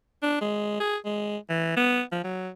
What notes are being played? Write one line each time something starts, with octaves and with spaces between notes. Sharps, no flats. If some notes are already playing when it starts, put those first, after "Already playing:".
D4
G#3
G#4
G#3
E3
B3
F3
F#3